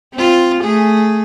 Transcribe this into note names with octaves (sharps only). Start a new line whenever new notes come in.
C4 F4
A3 G#4